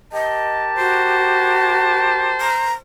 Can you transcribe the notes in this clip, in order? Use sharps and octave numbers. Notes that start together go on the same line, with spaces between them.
G4 A#4 D#5 A5
F#4 C5
A#5